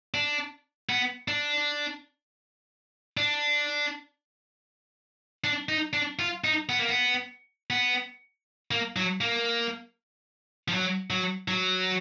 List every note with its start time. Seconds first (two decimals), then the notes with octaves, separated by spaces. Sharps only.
0.14 D4
0.89 B3
1.28 D4
3.17 D4
5.44 D4
5.69 D#4
5.93 D4
6.19 F4
6.44 D#4
6.69 B3
6.79 A#3
6.89 B3
7.70 B3
8.71 A#3
8.96 F#3
9.21 A#3
10.68 F3
10.73 F#3
11.10 F#3
11.48 F#3